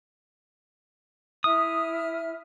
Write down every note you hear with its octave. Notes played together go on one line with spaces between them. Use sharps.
E4 E5 D#6 F6